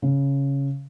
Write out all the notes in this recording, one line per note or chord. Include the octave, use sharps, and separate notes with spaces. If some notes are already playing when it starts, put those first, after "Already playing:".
C#3